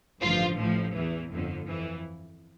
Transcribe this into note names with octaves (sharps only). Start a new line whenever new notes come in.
A1 G2 D3 F3 F4
A1 A2 F3
E2 E3
G1 F2 D3
F2 E3